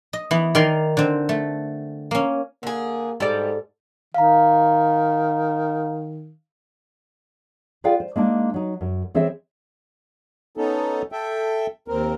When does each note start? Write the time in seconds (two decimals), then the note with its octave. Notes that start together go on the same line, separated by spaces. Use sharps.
0.13 D#5
0.31 E3 B3
0.55 D#3 A#4 D5 G#5 C6
0.97 D3 C4
1.29 A3
2.11 A#3 C#4
2.63 D3 A#3 G#4
3.20 G#2 G3 A4 D5
4.14 D#3 F5 A#5
7.84 F4 G#4 B4 D5 F5 G5
8.00 C5
8.16 G#3 A#3 D4 D#4
8.54 F#3 D#4
8.81 F#2
9.15 E3 C4 G#4 C5 C#5 E5
10.57 B3 C#4 D#4 A4
11.12 A4 E5 G5
11.88 D#2 C4 A#4